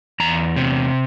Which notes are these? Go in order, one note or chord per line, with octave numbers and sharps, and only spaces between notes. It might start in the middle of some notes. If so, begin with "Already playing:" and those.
E2 A#5
C3